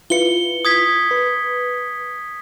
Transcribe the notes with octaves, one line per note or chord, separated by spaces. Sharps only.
E4 F4 B4 C#7 G7
D#6 G#6 B6
B4